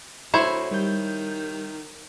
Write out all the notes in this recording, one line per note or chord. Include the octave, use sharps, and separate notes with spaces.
D2 E4 C5 C#5
D#3 G3 G6